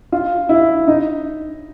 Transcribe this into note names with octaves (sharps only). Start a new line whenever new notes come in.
F4
E4
D#4